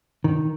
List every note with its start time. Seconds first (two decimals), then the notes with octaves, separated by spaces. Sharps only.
0.24 D#3